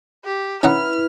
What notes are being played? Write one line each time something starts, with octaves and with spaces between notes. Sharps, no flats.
G4
C#4 D#4 E4 B4 F#5 F6